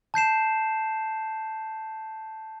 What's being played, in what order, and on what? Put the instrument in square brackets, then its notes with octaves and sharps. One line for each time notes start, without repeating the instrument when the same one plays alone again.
[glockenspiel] A5 G6 C7 E7